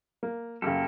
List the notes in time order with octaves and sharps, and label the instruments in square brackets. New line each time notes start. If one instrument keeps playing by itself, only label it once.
[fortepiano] A#3
[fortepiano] F#2 C#3 [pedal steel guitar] A#3 G4 A4